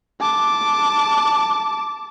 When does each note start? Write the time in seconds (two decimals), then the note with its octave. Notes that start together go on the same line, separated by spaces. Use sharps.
0.20 A5 D6